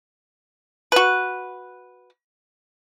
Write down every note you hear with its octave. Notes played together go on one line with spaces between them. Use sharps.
F#4 B4